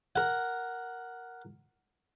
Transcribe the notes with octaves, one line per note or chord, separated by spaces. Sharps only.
A#4 F#5